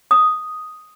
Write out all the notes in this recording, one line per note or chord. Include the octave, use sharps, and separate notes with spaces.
D#6